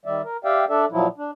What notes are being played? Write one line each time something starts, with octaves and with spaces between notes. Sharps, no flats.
D#3 G3 D5 E5
A#4
G4 D5 E5 F5 G5
D4 A4 D5 E5
A#2 F3 F#3 E4
D4